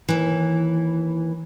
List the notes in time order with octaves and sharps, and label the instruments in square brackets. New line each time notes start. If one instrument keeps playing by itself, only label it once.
[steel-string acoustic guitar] D#2 E3